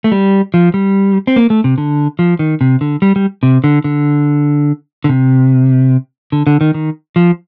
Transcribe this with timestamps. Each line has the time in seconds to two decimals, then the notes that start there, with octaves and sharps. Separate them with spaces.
0.04 A3
0.12 G3
0.54 F3
0.74 G3
1.27 C4
1.36 A#3
1.50 A3
1.64 C3
1.78 D3
2.19 F3
2.39 D#3
2.61 C3
2.81 D3
3.02 G3
3.16 G3
3.43 C3
3.64 D3
3.84 D3
5.04 D3
5.09 C3
6.32 D3
6.47 D3
6.61 D#3
6.74 D#3
7.16 F3